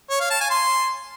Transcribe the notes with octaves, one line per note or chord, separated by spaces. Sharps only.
C#5
F5
A5
G#5
C6